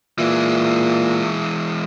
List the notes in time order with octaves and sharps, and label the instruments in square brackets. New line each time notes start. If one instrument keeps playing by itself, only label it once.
[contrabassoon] A#2 [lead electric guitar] E3 G#3